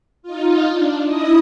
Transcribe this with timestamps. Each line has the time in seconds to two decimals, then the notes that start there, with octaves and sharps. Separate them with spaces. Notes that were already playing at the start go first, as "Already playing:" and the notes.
0.22 D#4 F4
0.69 D4
1.07 E4 D#5 D#6